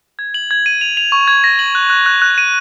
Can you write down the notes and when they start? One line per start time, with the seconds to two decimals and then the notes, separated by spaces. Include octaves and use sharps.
0.19 G#6
0.34 F#7
0.51 G#6
0.66 D#7
0.81 F7
0.97 F7
1.12 C#6
1.28 G#6
1.44 A#6
1.59 F#7
1.75 F#6
1.90 F#6
2.06 F#6
2.22 F#6
2.38 D#7